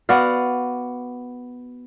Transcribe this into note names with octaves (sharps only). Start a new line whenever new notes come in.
B3 F#4 D5 F5